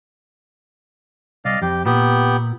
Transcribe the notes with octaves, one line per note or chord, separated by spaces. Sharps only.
C2 D5 D#5 F5
F2 G4
A#2 B3 G4